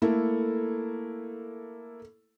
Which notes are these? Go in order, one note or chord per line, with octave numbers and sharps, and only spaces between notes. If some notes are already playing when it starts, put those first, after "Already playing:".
A3 A#3 E4 A4